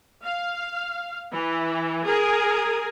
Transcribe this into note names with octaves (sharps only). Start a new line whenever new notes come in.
F5
E3
G#4 A#4